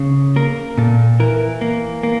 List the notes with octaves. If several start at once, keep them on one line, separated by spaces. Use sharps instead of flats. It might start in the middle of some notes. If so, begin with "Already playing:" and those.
Already playing: C#3
A#3 A#4
A#2 A4
E3 A#4
A#3
A#3